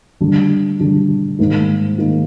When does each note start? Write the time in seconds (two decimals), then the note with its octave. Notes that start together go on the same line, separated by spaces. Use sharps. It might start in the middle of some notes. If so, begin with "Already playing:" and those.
0.21 D3 G3 D4
0.80 D3 G3 D4
1.39 G#2 D#3 A#3 D#4
1.98 D#3 A#3 D#4